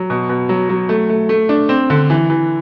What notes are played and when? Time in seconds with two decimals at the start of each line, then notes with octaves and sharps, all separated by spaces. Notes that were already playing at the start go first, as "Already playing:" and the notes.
Already playing: F#3
0.10 B2
0.29 B2
0.49 F#3
0.69 F#3
0.89 A3
1.09 A3
1.29 A3
1.49 D4
1.69 C4
1.90 D3
2.10 E3
2.30 E3